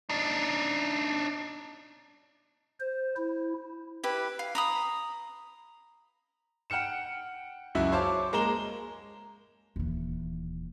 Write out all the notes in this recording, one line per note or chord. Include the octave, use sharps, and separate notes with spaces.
D4 D#4
C5
E4
E4 G4 B4
F5
A#5 B5 D#6
F#5 G5 F6 C#7 E7
C#2 F#2 E4 F#4 E5
C5 C#5 F5 A5 D6
G#3 A#3 A#5 E7 G7
D#1 E3